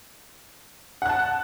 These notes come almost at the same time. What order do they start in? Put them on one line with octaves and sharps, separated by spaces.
F#5 F#6 A5